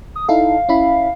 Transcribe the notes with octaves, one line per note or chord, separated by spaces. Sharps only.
D#6
D#4 E4 A4 F5
C#4 E4 B5